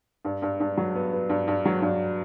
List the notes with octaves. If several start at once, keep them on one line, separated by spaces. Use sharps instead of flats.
G2
G2
G2
F#3
B3
B3
G2
G2
F#3
G2